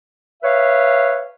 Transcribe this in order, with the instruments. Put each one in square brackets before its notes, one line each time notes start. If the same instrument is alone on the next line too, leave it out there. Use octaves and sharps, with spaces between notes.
[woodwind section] B4 C#5 E5 F5